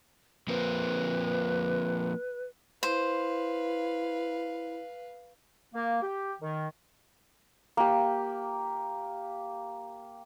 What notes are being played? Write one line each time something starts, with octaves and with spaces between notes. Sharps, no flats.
F3 A#3 C4 B4
E4 B4 C5 F5
A#3
G4
D#3
A#3 G4